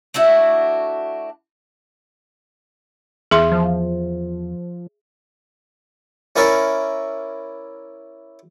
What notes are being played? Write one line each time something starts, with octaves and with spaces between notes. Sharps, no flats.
A3 D4 E4 F#4
E2 G#4 E5 C6
F3
C#4 E4 A#4 C#5 D5